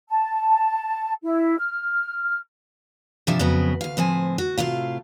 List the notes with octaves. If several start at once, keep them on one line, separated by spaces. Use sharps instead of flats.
A5
E4
F6
G2 C3 F3 D4 E5
F2 C#3 F#3 B3
D2 F5
A2 F3 C4 G#5
F#4
A2 C3 F4 F5